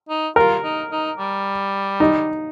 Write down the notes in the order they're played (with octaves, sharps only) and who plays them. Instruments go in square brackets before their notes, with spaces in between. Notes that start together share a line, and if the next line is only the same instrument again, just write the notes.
[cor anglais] D#4
[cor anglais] F4 [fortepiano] A#4
[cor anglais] D#4
D#4
G3
[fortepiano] D#4